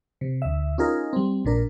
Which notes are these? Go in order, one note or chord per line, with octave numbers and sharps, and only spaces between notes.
C3
D2 E5
C#4 D#4 F4 G#4 A#4
G3 C4
A#1 A#2 D4 A#4